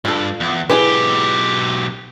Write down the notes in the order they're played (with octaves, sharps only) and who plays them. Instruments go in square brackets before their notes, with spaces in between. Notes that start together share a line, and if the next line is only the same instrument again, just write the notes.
[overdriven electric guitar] G2 [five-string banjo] F4 A4
[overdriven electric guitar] E2
[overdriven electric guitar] B1 G4 [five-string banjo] E4 G#4 B4